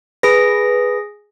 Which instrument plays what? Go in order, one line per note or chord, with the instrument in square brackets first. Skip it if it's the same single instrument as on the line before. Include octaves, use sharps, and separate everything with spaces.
[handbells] G#4 A#6 [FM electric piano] B4